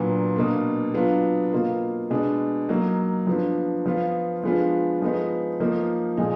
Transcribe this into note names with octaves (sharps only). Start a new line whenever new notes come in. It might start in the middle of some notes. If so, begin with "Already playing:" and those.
Already playing: A#2 F#3 B3 D4
B2 A#3 D4
F#3 B3 D4 F4
B2 A#3 F4
B2 G#3 D4
F#3 A#3 D#4
F3 B3 D4
F3 B3 F4
F3 G#3 B3 D4 F4
F3 G#3 B3 D#4
F3 A#3 D#4
A#2 F3 G#3 D#4